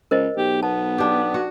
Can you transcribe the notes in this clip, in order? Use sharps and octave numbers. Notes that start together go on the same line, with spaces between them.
C#2 A#4 C5 D#5
B1 G4
B3 A5
D4 G4
F#4